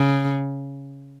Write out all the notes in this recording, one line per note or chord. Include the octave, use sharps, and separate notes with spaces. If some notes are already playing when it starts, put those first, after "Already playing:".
Already playing: C#3